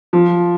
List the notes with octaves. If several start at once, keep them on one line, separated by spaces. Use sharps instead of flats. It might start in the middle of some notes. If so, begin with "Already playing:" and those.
F3